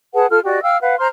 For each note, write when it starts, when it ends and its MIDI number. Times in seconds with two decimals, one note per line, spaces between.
0.15 0.27 68
0.15 0.27 71
0.15 0.27 78
0.15 0.27 81
0.30 0.39 65
0.30 0.39 69
0.30 0.39 89
0.44 0.62 66
0.44 0.62 67
0.44 0.62 74
0.44 0.62 75
0.63 0.77 77
0.63 0.77 79
0.63 0.77 88
0.63 0.77 89
0.81 0.97 71
0.81 0.97 77
0.81 0.97 78
0.98 1.08 72
0.98 1.08 82
0.98 1.08 84
0.98 1.08 89